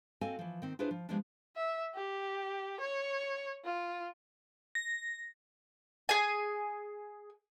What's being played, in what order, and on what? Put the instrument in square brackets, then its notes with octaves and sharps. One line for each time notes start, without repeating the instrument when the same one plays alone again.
[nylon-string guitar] C4 F#4 A4 D#5 F5 G#5
E3 F3
D#3 C4
D4 E4 F4 G#4 B4 C5
F3
F3 G3 G#3 B3 D4
[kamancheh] E5
G4
C#5
F4
[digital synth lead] A#6
[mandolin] G#4 G#5